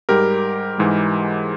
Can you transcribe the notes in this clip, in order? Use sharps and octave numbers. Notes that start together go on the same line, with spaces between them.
G#2 G3 G4 A#4
G#2 E3 G#3